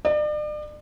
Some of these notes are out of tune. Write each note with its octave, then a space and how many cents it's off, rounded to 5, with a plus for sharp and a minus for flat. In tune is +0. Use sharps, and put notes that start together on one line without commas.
D5 +40